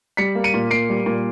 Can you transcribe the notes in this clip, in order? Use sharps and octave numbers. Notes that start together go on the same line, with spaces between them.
G3 B6 C#7
A#3
C#7 D#7
A#2
A#3 C7 D7
G3
A#2